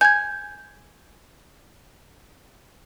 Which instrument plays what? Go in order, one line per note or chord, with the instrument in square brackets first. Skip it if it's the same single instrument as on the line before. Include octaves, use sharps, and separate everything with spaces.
[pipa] G#5 [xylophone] G6 G#6